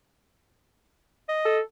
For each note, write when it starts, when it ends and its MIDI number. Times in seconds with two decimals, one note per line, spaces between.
1.29 1.58 75
1.45 1.61 69